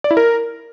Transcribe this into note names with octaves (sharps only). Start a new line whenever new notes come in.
D5
E4
A#4